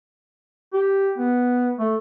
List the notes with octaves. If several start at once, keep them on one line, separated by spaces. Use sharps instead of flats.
G4
B3
A3